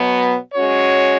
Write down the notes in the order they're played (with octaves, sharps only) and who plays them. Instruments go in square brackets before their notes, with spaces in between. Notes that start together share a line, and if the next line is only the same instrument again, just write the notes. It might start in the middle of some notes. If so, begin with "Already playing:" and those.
Already playing: [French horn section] B2 F#3 B3
G#3 C#4 F#4 C#5